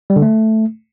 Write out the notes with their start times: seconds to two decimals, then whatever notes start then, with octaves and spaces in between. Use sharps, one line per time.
0.10 G3
0.16 D3
0.22 A3